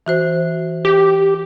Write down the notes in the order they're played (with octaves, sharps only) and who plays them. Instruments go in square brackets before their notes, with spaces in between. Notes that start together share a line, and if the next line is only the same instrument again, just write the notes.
[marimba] E3 F#4 C5
[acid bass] G4